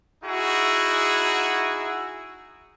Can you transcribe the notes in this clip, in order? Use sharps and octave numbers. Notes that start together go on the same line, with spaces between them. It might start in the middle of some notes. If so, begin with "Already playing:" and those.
D#4 E4 F#4 G#4